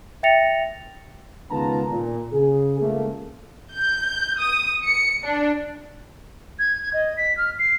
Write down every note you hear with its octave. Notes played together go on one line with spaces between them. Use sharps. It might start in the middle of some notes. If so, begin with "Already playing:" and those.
E5 G5 A6 A#6 C#7 F7
C#2 D#3 B3 F4 A5 A#5
A#2
C#3 G#4
C#2 A3 A#3
G6
D#6
C#7
D4
G#6
G#6
D#5
B6
F6
C7